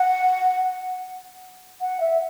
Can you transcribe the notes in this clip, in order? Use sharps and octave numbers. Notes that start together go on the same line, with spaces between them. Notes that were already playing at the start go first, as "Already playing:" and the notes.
Already playing: F#5
F#5
E5